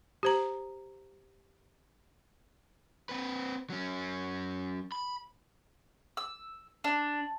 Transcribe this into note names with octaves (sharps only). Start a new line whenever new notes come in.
G4 C5 A#5
C4 B4
F#3 C#4
B5
E6
D4